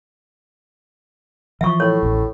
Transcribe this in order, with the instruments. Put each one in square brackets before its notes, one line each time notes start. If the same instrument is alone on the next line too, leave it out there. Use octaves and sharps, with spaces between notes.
[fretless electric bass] E3 F3 [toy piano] E5 C#6
[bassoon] A2 [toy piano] C#5
[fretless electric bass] A1 D#2